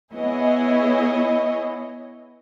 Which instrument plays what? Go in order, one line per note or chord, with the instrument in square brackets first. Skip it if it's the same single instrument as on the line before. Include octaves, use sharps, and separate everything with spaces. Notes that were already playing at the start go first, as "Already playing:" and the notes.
[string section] B3 E4 G#4 C#5 D#5